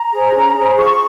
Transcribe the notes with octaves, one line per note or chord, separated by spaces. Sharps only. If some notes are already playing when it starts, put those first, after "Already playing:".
Already playing: A#5
G#4 C5
C#4
G#4 C5
F4 C#6